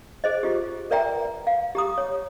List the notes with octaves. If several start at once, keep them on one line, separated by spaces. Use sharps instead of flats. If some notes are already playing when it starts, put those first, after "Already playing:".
G#4 C5 D#5
F4 G4
A#4 B4 D5 E5 G5 A#5
F5
G4 A#5 D#6
C#5